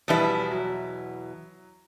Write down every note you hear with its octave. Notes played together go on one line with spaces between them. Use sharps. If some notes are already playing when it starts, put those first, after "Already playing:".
E2 B2 F3 G3 E4 B4
F#3